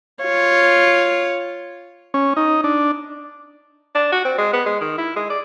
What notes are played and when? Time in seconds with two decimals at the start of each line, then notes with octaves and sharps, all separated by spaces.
0.23 F4 C#5
2.14 C#4
2.37 D#4
2.64 D4
3.95 D4
4.12 F#4
4.25 C4
4.38 G#3
4.53 B3
4.66 G#3
4.81 D#3
4.98 E4
5.16 G#3
5.30 D5